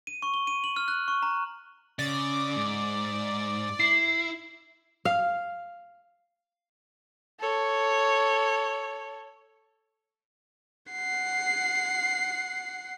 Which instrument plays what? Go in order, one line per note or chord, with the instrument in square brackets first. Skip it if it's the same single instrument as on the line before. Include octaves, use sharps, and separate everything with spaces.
[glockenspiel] D#7
C#6
G7
D#7
F#7
F6
F#6
C#6
A#5
[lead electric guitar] C#3 [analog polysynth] D5
[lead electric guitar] G#2
[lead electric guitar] E4 [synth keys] C7
[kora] F5
[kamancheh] A4 C#5
[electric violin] F#5 C7